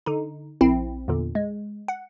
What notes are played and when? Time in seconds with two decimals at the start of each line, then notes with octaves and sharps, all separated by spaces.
0.06 D3 D#4
0.61 A#1 C4 E4
1.08 E2 A#2 D3
1.35 G#3
1.88 F#5